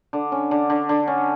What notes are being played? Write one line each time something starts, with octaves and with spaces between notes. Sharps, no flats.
D3
C#4
D3
D3
D3
C#4